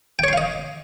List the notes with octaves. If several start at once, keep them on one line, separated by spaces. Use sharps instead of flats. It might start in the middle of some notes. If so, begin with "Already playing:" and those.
C#5 D#5 F5 G5 C6